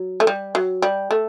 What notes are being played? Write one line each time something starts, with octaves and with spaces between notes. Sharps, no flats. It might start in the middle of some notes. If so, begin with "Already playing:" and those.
Already playing: F#3
A3
G3
F#3
G3
A3